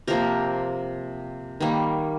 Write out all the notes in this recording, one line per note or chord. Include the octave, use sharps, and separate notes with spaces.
C3 F3 A#3 G4 A#4
D#3 G3 A#3